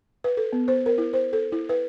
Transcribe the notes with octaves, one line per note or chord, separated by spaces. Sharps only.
B4
A4
B3
C5
A#4
E4
C5
A4
E4
B4